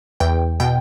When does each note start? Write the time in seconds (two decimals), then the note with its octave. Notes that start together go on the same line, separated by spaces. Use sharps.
0.20 E2 G5
0.60 B2 G5